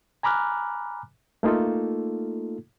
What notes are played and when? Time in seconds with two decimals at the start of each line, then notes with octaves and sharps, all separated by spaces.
0.23 G#5 A#5 B5 D6 F6 F#6
1.43 A3 A#3 D#4 F4 A4